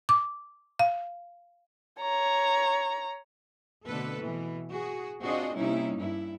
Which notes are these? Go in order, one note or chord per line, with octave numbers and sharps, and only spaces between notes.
D6
F5
C#5 A#5
B2 D3 A3 C4 A4 B4
B2 E3
F#4 G#4
C4 D4 F4 F#4 G#4 D#5
C3 G3 A#3 C#4 D#4 E4
G2 E4